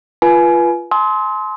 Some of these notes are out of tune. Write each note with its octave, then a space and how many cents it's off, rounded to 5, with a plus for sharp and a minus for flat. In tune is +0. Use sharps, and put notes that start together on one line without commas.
F4 -15 B4 -20 G#5 +25
G#5 +45 C6 +0 D#6 +45